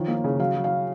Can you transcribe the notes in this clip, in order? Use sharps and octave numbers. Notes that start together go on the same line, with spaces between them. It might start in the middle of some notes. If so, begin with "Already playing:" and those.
Already playing: D#3 F3 C#5
A#3
C#3
F#3 F5
F#3
F5